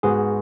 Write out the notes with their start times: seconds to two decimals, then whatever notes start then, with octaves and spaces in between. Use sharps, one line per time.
0.03 G#2 G#3 B3 F#4 G#4